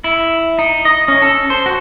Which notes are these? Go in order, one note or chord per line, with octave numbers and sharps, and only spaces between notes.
E4
D#4
D#5
C#4
A4
C5
F#4